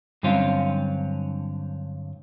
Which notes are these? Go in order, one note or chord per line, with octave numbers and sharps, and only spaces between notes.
G2 D3 F#3 C4 C#4 F4